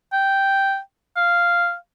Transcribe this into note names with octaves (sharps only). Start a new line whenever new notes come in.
G5
F5